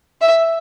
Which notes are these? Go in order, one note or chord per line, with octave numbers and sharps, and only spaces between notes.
E5